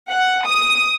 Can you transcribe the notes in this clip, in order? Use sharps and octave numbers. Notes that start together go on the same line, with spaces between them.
F#5
D#6